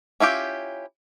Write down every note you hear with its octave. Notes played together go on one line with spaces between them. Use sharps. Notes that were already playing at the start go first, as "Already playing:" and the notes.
C#4 E4 F4 G4